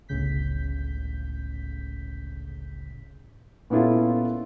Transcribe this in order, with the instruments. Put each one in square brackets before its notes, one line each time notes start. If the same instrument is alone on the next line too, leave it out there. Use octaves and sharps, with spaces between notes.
[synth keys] G1 C#2 A2 C#3 G6 B6
[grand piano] A#2 B3 C#4 E4 F4 A4